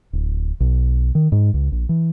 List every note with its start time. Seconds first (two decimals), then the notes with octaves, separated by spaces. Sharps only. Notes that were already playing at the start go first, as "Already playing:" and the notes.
0.13 D1
0.60 B1
1.15 D#3
1.32 G#2
1.54 C#2
1.72 A#1
1.89 E3